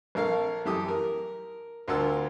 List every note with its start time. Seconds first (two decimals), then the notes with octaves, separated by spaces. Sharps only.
0.15 A#1 A4 A#4 F5
0.65 F#2 E3 G4 A4 D#6
0.88 A#4
1.88 D2 F4 A#4 F#5 A5 E6